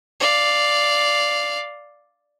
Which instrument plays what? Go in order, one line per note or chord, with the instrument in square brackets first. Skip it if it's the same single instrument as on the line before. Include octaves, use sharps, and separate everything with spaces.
[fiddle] D5 F5